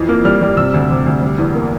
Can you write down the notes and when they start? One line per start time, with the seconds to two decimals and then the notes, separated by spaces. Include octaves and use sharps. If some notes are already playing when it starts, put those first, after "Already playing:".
Already playing: F2 E3
0.09 A#3
0.25 G3 F6
0.41 G3
0.57 C3 E6
0.74 D2
0.90 C3
1.06 D2
1.22 G3
1.38 E2
1.55 A#3